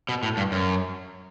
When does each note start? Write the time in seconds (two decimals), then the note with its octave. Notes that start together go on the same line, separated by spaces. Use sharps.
0.09 B2
0.23 A2
0.37 G2
0.52 F#2